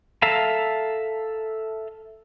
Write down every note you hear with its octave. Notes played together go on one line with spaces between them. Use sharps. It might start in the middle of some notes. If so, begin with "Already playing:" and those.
A4 E5 F5 A5 A#5